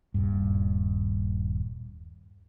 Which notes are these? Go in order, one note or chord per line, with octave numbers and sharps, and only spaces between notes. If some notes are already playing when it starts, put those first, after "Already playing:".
D#1 G2